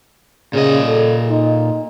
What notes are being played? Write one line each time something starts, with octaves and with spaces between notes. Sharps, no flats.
A#2 C#3 D#5
A4
D#4